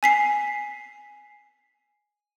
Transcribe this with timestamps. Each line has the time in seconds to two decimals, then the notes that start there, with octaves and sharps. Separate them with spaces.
0.03 G#5 B6 C7